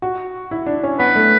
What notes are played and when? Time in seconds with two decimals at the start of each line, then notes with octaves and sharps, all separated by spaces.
0.02 F#4
0.51 E4
0.66 D4
0.83 C#4
0.99 B3 B4
1.15 A3